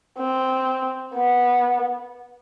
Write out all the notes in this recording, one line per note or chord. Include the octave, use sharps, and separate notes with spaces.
C4
B3